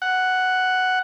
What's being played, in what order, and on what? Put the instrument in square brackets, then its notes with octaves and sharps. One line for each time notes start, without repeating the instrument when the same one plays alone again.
[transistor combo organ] F#5